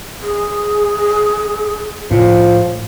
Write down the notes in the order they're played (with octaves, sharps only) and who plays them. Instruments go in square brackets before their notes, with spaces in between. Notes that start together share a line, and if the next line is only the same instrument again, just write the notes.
[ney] G#4
[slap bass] A2 [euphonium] F3